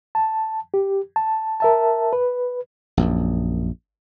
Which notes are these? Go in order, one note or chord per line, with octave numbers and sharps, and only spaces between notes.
A5
G4
A5
A#4 E5 A5
B4
A#1 F#2